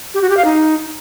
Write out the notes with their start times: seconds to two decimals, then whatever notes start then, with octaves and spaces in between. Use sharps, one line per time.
0.14 G4
0.22 F#4
0.29 G4
0.37 F5
0.45 D#4